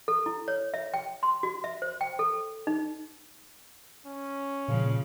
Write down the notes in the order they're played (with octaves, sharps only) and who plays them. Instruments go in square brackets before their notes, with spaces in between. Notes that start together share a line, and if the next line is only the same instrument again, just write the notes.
[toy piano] A4
E4
C#5
E5
G5
C6
F#4
E5
C5
G5
A4
D#4
[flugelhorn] C#4
[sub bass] A#2 [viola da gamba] C#3 F3